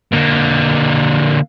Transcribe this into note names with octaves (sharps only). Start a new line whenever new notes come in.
D3 A#3